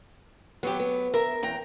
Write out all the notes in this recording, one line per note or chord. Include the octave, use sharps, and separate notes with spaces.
F#3 B3 G4
B3
A#4 E5
E2 G5 A#5